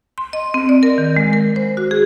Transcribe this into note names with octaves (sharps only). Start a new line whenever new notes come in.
C6
D#5
C4
D5
A#4
D#3
G#3
A#4
C5
F#4
G#4